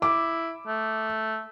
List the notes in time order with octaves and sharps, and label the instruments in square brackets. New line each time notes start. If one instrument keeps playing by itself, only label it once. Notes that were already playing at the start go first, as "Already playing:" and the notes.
[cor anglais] E4 [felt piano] D6
[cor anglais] A3